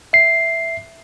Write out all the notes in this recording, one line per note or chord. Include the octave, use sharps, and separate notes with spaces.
E5 C7